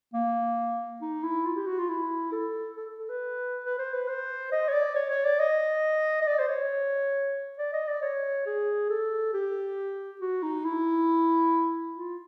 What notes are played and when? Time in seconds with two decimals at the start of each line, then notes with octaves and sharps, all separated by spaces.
0.14 A#3
1.02 D#4
1.23 E4
1.46 F4
1.56 G4
1.67 F#4
1.78 F4
1.89 E4
2.32 A4
2.77 A4
2.99 A4
3.10 B4
3.64 B4
3.79 C5
3.93 B4
4.08 C5
4.52 D#5
4.68 C#5
4.74 D5
4.95 C#5
5.10 C#5
5.25 D5
5.39 D#5
6.22 D#5
6.27 D5
6.39 C5
6.49 C#5
7.59 D5
7.73 D#5
7.88 D5
8.02 C#5
8.46 G#4
8.89 A4
9.34 G4
10.21 F#4
10.43 D#4
10.65 E4
11.96 F4